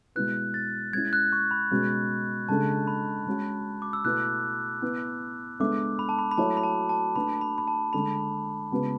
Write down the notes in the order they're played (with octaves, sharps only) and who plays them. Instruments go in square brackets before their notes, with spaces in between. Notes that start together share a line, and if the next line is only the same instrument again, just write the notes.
[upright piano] B2 G#3 B3 E4 B4 [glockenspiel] F#6
[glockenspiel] A6
[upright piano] G#3 C#4 E4 [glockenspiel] G#6
[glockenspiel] F#6
C#6
B5
[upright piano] B2 G#3 C#4
[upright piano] C#3 G#3 D4 A4 [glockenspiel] A5
[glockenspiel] B5
[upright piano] G#3 C#4 F#4
[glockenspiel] D6
E6
[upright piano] B2 A3 E4 B4 [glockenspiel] F#6
[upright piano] B3 E4 B4
[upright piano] G#3 B3 D4 A4 E5 [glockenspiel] D6
[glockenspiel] B5
A5
B5
B5
[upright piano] F#3 A3 E4 A4 C#5 [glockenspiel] A5
[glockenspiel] B5
A5
A5
[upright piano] A3 D4 F#4 B4 [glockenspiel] B5
[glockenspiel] B5
B5
A5
[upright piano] D3 G#3 D4 A4 [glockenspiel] B5
[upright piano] C#3 G#3 B3 F#4 B4